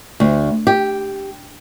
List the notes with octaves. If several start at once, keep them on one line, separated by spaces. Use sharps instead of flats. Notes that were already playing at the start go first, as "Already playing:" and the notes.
D2
G4